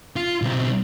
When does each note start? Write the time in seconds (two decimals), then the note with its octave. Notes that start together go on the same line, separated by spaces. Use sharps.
0.16 F4
0.42 B1 C4